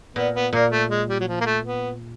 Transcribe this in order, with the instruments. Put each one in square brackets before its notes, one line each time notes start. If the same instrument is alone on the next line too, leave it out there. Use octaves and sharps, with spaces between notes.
[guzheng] A#2 [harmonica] B3
[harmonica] B3
[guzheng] A#2 [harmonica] A#3
[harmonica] A3
G#3
G3
F#3
F3
A#3
A3
B3